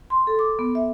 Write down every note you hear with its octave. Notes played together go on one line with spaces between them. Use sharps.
C6
A4
D6
B3
E5